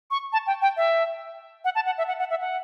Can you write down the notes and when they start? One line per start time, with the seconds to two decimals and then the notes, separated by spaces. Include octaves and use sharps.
0.11 C#6
0.33 A5
0.47 G5
0.62 G5
0.77 E5
1.65 F#5
1.75 A5
1.86 F#5
1.98 E5
2.08 F#5
2.19 F#5
2.30 E5
2.41 F#5